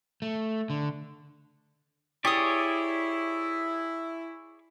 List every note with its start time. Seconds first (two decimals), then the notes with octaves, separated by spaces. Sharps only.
0.22 A3
0.70 D3
2.25 E4 G4 G#4 C#5 D5 D#6